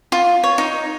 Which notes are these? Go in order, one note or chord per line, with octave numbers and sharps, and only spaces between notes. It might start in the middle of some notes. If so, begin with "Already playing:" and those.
F4
C#5
D#4